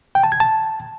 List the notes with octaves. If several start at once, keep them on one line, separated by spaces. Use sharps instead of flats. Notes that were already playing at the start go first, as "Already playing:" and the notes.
G5
A5
G#6
A5